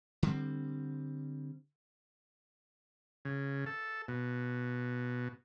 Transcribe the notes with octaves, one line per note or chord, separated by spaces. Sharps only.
D3 G3 C4
C#3
A4
B2